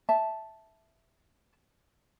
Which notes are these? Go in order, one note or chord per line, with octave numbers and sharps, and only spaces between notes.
E5 A5